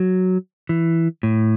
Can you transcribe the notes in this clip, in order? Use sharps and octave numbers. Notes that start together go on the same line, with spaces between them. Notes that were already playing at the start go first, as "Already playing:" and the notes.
Already playing: F#3
E3
A2